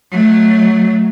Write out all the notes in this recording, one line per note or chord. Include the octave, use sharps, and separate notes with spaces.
F#3 A3